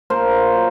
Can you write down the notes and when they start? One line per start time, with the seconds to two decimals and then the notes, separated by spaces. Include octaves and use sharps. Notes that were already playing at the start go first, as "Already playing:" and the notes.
0.10 A#2 A#4 C5
0.55 F#3